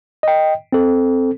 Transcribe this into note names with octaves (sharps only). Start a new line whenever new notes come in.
D#5 G5
C4 A4